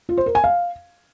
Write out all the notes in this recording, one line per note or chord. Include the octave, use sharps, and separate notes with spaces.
F4
C5
A#4
G#5
F5